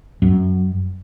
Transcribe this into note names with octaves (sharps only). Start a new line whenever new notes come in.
F#2